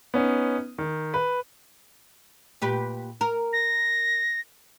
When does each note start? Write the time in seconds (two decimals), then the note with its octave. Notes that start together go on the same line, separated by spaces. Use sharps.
0.14 B3 C#4 D#4
0.78 D#3
1.14 B4
2.62 A#2 G4 B4
3.21 A#4
3.53 A#6